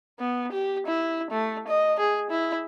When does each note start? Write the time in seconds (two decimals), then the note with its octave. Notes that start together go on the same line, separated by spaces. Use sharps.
0.19 B3
0.52 G4
0.87 E4
1.31 A3
1.68 D#5
2.00 G#4
2.30 E4